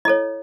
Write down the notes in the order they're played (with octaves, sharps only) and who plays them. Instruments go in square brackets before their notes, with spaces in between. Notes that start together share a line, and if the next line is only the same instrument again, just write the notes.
[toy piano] E4 A4 C#5 D#5